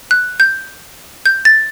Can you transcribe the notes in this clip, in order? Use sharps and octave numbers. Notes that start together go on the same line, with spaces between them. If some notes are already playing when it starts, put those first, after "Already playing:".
F#6
G6
G6
A6